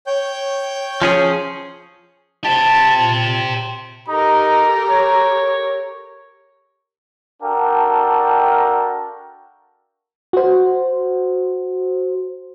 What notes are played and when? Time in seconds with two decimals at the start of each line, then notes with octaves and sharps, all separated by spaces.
0.07 C#5 G5 G6
1.02 F3 C#4 G#4
2.44 G4 C5 A5 A6
2.97 A#2
4.08 D#4 G4 A4 A#4 A#5
4.90 C#5
7.43 D4 F#4 A4 A#4 F5 G5
10.33 F#4 C5